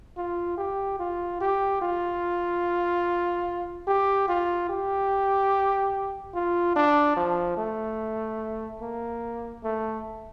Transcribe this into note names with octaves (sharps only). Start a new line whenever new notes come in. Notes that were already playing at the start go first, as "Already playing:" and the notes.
F4
G4
F4
G4
F4
G4
F4
G4
F4
D4
F3
A3
A#3
A3